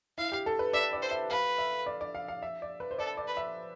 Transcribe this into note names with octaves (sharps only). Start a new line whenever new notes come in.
E4 F5
G4
A4
B4
D5 E5
D5
C5
E5
B4 F5
E5
D5
D5
F5
F5
E5
D5
B4
C5
A4 D5
D5
B4
E5